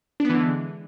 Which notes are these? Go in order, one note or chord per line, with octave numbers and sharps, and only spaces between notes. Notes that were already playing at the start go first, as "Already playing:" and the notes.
D3 E3 G#3 B3 D4